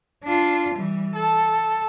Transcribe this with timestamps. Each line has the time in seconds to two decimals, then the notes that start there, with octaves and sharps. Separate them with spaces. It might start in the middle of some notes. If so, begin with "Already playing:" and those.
0.24 D4 F4
0.74 E3 G3
1.15 A4